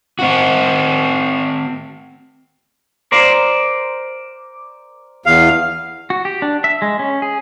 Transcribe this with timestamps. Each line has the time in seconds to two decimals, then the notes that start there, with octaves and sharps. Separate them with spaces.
0.19 C4 F#4
3.12 A#4 C5 D5
5.26 E2 F5
6.10 F#4
6.25 G4
6.42 D4
6.64 E5
6.82 G#3
6.99 C#4
7.22 G#4